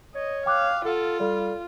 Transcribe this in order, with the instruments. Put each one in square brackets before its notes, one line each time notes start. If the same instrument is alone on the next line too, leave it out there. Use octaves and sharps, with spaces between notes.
[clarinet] C#5 [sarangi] D#5
[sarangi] F5 [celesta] G5 D6 F#6
[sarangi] F4 [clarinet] A4 [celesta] F#5
[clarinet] G3 [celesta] A4 D5